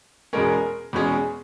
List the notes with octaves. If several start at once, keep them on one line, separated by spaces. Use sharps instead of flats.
E2 B2 G#3 C#4 A#4
E2 B2 G#3 C#4